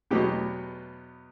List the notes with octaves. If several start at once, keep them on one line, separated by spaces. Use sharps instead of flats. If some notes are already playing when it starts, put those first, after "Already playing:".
E2 B2 F#3 G4